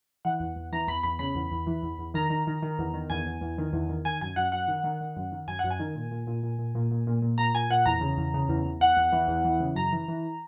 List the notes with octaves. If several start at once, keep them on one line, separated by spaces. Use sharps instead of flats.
E3 F#5
E2
E2
E3 A#5
E2 B5
E2 B5
C#3 B5
E2
E2
E3
E2
E2
D#3 A#5
D#3
D#3
D#3
E2
D#3
E2 G#5
E2
E2
D#3
E2
D#3
D#3 G#5
F#2 G#5
F#2 F#5
F#2 F#5
D#3
D#3
D#3
F#2
D#3
F#2 G#5
F#2 F#5
G#5
D#3
A#2
A#2
A#2
A#2
A#2
A#2
A#2
A#2
A#2
A#2 A#5
A#2 G#5
A#2 F#5
E2 A#5
C#3
E2
C#3
E2
E2
E2 F#5
E2
E3
E2
E3
C#3
F#2 A#5
E3
E3